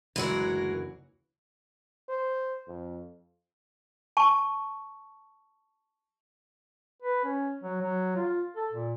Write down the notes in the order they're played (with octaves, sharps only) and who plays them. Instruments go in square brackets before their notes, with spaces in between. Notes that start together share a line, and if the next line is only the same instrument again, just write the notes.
[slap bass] F#1 D2 [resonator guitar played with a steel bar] E3 F#3 [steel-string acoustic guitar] G#3 F#4 A#4
[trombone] C5
F2
[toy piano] A5 C#6
[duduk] B4
C#4
F#3
F#3
F4
A4
A#2